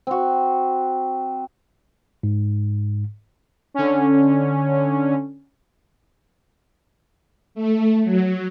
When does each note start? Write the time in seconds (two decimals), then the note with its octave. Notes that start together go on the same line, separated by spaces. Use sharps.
0.07 C4 F#4
2.23 G#2
3.74 D3 C#4
7.55 A3
8.04 F#3